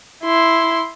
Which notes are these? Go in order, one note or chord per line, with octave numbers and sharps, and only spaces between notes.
E4 C6